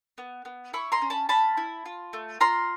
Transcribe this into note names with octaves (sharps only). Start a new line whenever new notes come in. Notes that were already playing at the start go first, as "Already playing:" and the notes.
B3
B3
E4 B5 C#6
A#5 C6
C#4
A5 B5
C#4 A5 B5
E4
F4
A3
F4 A#5 C6